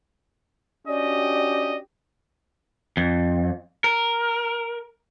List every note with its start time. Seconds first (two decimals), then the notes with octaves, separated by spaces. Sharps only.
0.87 C#4 D4 F#4 G4 D5 D#5
2.97 F2
3.84 A#4